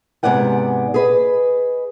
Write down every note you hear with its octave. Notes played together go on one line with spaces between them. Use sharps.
G#2 C3 B3 D5 F#5 G#5
G#4 B4 D#5